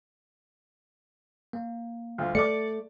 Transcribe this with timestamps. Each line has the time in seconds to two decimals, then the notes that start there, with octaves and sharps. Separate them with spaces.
1.53 A#3
2.18 D2 F4
2.35 A3 D5 D6 C#7